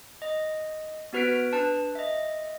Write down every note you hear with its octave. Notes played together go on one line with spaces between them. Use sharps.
D#5
B3 F#4 B4 F6 B6 D7
B4
D4 B4 A5
D#5 E5